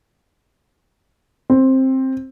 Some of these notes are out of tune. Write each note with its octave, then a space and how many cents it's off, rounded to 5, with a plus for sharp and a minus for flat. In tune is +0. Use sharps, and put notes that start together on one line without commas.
C4 +10